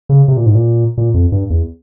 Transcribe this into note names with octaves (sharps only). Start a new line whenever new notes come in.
C#3
C3
A#2
G#2
A#2
A#2
F2
G2
E2